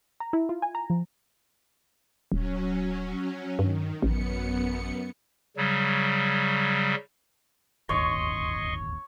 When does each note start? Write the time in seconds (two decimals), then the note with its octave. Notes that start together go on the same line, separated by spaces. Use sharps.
0.20 A#5
0.33 E4
0.49 F4
0.62 G#5
0.75 A#5
0.90 F3
2.32 D#1 F#3 C#4
3.59 G2 D#3
4.02 A1 F#2 B3 C#7
5.57 C#3 F#3 G3
7.89 D1 G1 D#2 C#5 D#5 C6 C#6